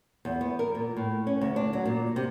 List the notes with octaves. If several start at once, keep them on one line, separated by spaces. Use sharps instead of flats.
E2
B3
A#4
A#2
A2
C#4
D2
D4
F#3
A#2
C3